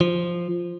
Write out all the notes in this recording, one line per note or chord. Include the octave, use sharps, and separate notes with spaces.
F3